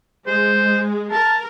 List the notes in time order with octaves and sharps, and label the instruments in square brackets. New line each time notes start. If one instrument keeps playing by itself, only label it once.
[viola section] G#3 [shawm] C5
[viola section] A#4 [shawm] A5